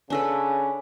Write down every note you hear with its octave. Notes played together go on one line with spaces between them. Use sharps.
C#3 C#4 D4 A4 B4